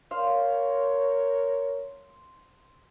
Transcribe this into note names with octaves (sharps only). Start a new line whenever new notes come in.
A#4 C5 C#5 F5 C6